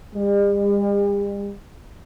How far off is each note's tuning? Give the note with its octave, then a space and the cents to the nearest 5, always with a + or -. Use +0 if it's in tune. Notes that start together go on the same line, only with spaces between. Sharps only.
G3 +45